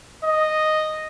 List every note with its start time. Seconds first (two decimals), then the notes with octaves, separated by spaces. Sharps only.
0.25 D#5